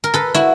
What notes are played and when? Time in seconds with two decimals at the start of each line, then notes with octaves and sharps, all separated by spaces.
0.04 A#4
0.14 A4 B4
0.34 E4 F#4